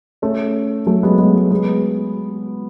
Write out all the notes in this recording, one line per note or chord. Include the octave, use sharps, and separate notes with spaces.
A3 C#4
F#3 A3
G#3 B3
G#3 B3
G#3
G#3 B3